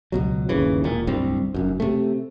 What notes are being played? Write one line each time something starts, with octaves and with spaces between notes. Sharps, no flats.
C#2 B2 F#3
G1 D#2 C#3 E3
E1 A#2
D1 C2 G2 C4
F1 F#2
C3 A3